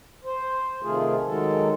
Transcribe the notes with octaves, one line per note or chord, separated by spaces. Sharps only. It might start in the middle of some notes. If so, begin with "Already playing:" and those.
C5
C3 D#3 F3 A3 F4 G#4
D#3 F#3 G#3 A4